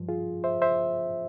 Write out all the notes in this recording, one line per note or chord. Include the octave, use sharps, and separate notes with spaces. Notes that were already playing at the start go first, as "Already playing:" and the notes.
Already playing: G2 F3
F4 G#4
C5 E5
C5 E5